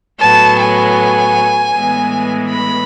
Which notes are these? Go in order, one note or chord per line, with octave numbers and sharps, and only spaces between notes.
A2 F#3 B3 A5
G#5
A2 E3 G#3 B3
B5